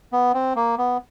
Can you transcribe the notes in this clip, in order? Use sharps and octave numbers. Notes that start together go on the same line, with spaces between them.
B3
C4
A#3
B3